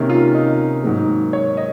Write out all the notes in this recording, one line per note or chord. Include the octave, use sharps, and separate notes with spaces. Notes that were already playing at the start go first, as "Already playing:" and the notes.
Already playing: C3 D#3 A#3 C#4
F4
D#4
G#2 D#3 F#3 A#3
C#5
D#5